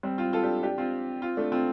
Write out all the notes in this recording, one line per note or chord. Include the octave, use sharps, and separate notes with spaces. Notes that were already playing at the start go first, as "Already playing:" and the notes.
G3 C4
C4 F4
F4 A4
D4 G4
D4 G4
C4 F4
C4 F4
A3 D4
C4 F4